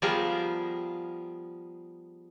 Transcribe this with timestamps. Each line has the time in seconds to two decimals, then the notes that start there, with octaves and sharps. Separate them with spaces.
0.02 F3 G3 B3 G#4 A#4 A#5